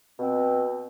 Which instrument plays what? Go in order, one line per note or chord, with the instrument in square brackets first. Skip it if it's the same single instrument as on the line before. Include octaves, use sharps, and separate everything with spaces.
[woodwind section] B2 C4